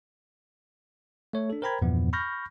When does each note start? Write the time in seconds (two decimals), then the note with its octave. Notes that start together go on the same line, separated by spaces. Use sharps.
1.33 A3 C#5
1.50 D4 A4
1.62 A#4 C5 G5 A#5 B5 G#6
1.82 E2 G2 A#2 F3 B3
2.13 B5 C#6 F6 G6 A#6